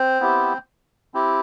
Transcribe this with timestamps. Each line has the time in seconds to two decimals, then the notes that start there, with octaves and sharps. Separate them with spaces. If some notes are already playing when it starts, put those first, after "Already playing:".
Already playing: C4 C5
0.20 B3 E4 G4
1.14 C4 E4 G4